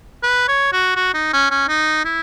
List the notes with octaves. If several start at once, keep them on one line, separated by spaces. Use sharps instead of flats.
B4
C#5
F#4
F#4
D#4
C#4
C#4
D#4
E4